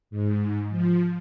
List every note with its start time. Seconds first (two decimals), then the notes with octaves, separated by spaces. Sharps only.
0.10 G#2
0.70 F3